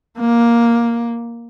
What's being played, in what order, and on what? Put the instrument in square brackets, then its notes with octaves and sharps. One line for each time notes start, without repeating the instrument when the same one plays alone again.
[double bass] A#3